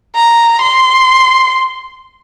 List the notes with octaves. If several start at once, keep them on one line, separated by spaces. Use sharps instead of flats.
A#5
C6